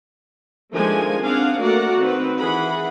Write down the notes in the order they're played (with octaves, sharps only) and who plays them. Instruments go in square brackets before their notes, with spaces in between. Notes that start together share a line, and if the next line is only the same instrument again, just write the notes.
[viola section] D#3 F3 G#3 A3 D4 G#5
C4 D4 G#4 F5 F#5
A3 A#3 F#4 A#4 D5 F#5
D#3 C4 B4
E3 G#4 F#5 B5